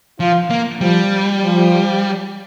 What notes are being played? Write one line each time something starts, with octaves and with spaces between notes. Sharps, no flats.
F3 F4
A#3
F3 G3
F3